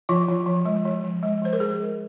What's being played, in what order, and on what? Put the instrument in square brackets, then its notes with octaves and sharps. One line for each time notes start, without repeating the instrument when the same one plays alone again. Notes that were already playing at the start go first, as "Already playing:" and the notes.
[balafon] F3 F4
F3
F3
G#3
F3
F3
G#3
F3 C5
A#4
G#3 G#4
G#3